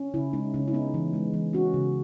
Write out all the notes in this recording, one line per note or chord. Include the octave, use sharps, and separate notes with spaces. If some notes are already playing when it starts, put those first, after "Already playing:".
Already playing: C#4
C#3 E4
G#3 D#4
C#3 C#4
E4
B3 D#4
E3
G#3
E3
C#4 F#4
C#3